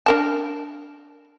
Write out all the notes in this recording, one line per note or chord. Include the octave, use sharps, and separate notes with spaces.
D4 A#4 A5